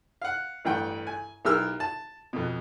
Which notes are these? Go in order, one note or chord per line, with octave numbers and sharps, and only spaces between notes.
F5 F#5
A1 G2 F#5 G5
G#5
B1 E4 G4 A#4 E6 F6
A5
F2 B2